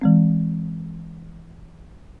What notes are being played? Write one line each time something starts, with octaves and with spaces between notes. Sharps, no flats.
E3 G#3 C4